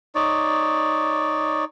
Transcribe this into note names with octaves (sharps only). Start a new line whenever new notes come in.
D#4 C#5 D5